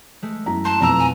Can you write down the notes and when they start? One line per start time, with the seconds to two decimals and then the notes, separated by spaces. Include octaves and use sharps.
0.22 G#3 A3
0.46 F#2 E4 A#5
0.65 F#4 A5 C6
0.81 F2 B2 F3 F#3 A#5 E6
0.99 G#5